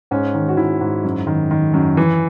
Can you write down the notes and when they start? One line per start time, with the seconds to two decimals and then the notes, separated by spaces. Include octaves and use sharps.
0.11 G#2 C#4
0.35 D#3
0.48 F#4
0.57 D#3 E4
0.81 G#2
1.04 F#2
1.27 D#3
1.51 D#3
1.74 F#2
1.97 E3